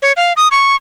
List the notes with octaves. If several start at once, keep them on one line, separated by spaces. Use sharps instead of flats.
C#5
F5
D#6
C#6